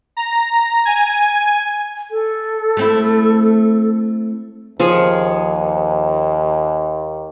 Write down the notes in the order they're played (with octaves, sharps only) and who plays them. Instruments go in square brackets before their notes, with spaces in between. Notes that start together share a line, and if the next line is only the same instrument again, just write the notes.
[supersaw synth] A#5
G#5
[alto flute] A4
[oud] A3 C4 E4
[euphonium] D#2 [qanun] F3 G#4 C#5